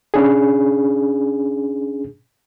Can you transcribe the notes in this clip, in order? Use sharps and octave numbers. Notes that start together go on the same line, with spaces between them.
C#4 D4 G#4